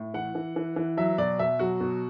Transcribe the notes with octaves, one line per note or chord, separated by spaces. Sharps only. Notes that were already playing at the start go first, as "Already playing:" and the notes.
Already playing: A2
E3 F#5
E3
E3
E3
F#3 E5
B2 D5
B2 E5
F#3 F#4
B2